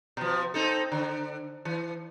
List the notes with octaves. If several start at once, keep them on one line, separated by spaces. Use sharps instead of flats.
B2 F3
C4 D#4 A4
D3
E3